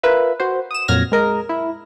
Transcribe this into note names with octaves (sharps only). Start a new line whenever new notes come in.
F4 A#4 B4 E5
F#4 C5
D#6 E7
F2 A#2 F#3 F6 G#6 A#6
G#3 A#4 D#5
E4